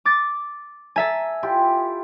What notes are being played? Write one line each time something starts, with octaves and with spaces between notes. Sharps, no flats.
D6 A6
A4 E5 G#5 A#5
E4 F4 G4